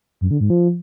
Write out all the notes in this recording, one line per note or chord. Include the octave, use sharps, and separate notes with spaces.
F#2
D3
G#2
F3